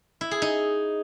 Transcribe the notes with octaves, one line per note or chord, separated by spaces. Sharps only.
E4
G#4
D#4